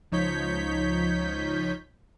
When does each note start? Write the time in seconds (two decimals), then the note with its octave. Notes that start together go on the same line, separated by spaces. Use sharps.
0.12 C#2 F3 D#4 C#5 G6 B6